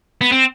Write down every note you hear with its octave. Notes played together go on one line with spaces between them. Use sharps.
B3
C4